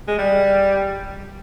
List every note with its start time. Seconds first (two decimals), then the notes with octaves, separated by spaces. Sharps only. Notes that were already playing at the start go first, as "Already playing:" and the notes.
0.08 G#3
0.18 G3